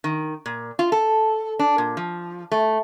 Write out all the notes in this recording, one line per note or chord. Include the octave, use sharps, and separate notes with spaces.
D#3
A#2
F4
A4
D4
A#2
F3
A3